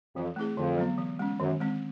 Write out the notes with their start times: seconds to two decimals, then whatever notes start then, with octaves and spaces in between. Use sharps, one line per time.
0.15 F2 E3
0.36 A3 C4 E4 G#4
0.57 F2 D3
0.77 F#3 B3
0.98 E3
1.19 G#3 C#4
1.39 F#2 D#3
1.60 G#3 C4